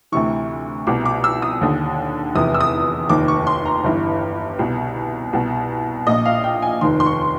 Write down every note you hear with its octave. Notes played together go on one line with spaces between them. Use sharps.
D2 C3 E3 C#6
C2 B2 D6
D6
E6
D#6
D#2 D3
F1 E2 C3 D#6
E6
D#6
F1 D#2 D#3 D6
C#6
C6
A#5
G1 G2 E3
C2 B2
C2 B2
A#1 A#2 D#5
F5
G5
G#5
F1 D#2 D#3 C6
C6
C#6